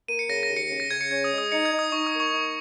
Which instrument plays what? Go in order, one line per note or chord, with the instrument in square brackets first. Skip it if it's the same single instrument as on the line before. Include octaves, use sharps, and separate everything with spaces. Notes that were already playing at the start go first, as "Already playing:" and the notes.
[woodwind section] A#3 [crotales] D#7
[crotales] C#7
[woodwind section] C#3 [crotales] A#6
[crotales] A#6
[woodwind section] D#2
[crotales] C#7
[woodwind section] C#3
[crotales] A#6
[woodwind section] C#3 [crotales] G#6
[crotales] C#7
[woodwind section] C#4 [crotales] G#6
[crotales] D#6
[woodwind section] G#3
[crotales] D#6
[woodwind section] D#4 [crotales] C#7
[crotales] G#6
[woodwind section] D#4
[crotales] D#6
[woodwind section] D#4 [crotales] C#6
[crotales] D#6
[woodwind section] A#3
[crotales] C#6
[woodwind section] D#4